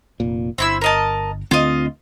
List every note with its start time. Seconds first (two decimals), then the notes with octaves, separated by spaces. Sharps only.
0.20 F1 A#2
0.58 G1 C4 E4 E6
0.81 A#4 D#5 A5
1.51 D2 D3 C4 F4 D#5